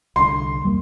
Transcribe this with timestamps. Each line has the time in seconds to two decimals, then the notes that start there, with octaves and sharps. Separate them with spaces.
0.16 C2 D3 C6
0.63 E2 G3 A#3